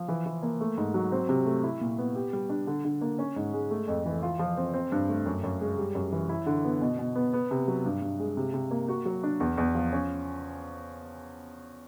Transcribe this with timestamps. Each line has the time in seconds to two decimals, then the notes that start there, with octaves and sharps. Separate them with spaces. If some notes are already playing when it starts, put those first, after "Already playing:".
Already playing: F3
0.08 E3
0.26 E3
0.43 A#3
0.61 A3
0.77 G#2
0.94 F#3
1.12 C4
1.29 C3
1.46 A3
1.64 E4
1.81 A#2
1.98 B3
2.15 G4
2.33 G3
2.49 D4
2.67 D3
2.85 D3
3.01 A#3
3.19 C#4
3.36 G#2
3.53 G#3
3.71 A3
3.88 F2
4.06 E3
4.23 F4
4.39 F3
4.57 C4
4.74 C4
4.92 G2
5.09 A3
5.26 F#2
5.43 F#2
5.61 G#3
5.78 G3
5.95 F#2
6.12 E3
6.29 E4
6.46 D3
6.65 B3
6.81 B2
6.99 B2
7.15 B3
7.33 B3
7.51 C3
7.68 F#3
7.85 G2
8.02 G2
8.20 G#3
8.37 C3
8.54 C3
8.71 A#3
8.88 F#4
9.05 F#3
9.23 D4
9.40 E2
9.57 E2
9.75 F3
9.92 C#4